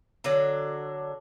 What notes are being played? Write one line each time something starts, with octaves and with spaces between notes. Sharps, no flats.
D3 F#3 D4